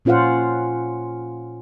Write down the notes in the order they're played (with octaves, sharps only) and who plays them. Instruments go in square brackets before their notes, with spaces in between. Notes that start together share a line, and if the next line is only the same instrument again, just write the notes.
[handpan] A#2 C#4 F4 C5 F5 F#5